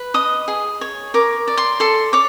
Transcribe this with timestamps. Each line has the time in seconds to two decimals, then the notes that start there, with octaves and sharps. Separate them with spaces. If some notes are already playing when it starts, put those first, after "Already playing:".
Already playing: B4
0.14 D#5 D#6
0.48 G#4
0.81 C#5
1.14 A#4 D6
1.48 D5
1.57 C6
1.80 A4 C6
2.13 C#5 D6